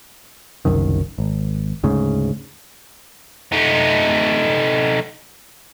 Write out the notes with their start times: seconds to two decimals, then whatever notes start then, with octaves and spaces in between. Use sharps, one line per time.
0.65 F#1 C2 F#2 D#3
1.18 G#1
1.84 D2 G#2 C#3
3.52 A3 D#4